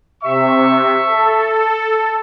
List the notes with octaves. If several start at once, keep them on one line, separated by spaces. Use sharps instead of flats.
C3 E5 C#6
A4